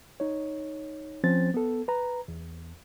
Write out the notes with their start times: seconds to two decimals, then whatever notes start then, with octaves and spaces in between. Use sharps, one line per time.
0.20 D#4 C#5
1.24 F3 C4 C#4 C5 A6
1.54 B3 A4
1.88 B4 A#5
2.28 E2